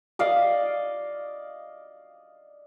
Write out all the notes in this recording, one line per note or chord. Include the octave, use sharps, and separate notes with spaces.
D5 D#5 F5